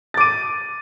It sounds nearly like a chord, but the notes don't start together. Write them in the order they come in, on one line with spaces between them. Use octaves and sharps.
A6 D6 D#7